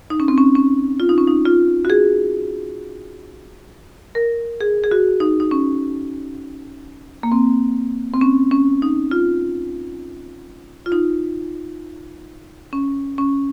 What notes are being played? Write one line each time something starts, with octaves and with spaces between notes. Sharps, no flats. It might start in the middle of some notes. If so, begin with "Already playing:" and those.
D#4
C#4
C4
C#4
C#4
F4
D#4
C#4
D#4
F4
F#4
G#4
A#4
G#4
G#4
F#4
D#4
D#4
C#4
A#3
C4
C4
C#4
C#4
D#4
F4
F4
D#4
C#4
C#4